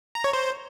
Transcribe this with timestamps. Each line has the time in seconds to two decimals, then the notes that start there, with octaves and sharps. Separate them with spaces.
0.15 A#5
0.24 C#5
0.33 C5